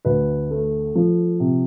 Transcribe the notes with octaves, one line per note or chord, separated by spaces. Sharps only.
D2 B4
A3
F3
C3